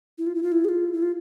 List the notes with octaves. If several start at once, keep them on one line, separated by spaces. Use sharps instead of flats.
E4
F4
E4
F4
E4
G#4
F4
E4
F4